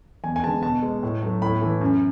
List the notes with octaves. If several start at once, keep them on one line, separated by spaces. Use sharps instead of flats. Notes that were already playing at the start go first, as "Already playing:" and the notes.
E2 G#5
G#5
D3 G#3 A5
B2 A5
G#3
A2
F#3 A3
A2 B5
E3 A3
F#2